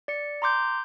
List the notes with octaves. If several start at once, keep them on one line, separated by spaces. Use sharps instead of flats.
D5 C#7
A#5 C6 D6 G6